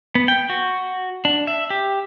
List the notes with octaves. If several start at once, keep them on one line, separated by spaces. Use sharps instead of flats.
B3
G5
F#4
D4
E5
G4